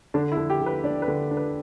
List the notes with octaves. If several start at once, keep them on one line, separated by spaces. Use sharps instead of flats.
D3 D4
E4
D3
G4
D3
B4
D4 D5
B4
D3
D4
B4